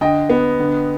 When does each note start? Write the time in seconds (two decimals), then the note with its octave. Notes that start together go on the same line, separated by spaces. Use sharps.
0.01 D3 D#5 G5
0.30 B3
0.59 D3